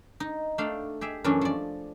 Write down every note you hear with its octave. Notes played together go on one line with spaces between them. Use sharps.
D#4
A3 D4 D5 F5 G5
G4 G#4 E5
F#2 E3 A3 C#4 D4
F3 D5